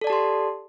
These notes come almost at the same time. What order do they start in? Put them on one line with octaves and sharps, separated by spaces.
A4 D5 A5 G4 C6